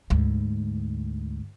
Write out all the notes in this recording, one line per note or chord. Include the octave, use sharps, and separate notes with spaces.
D2 G#2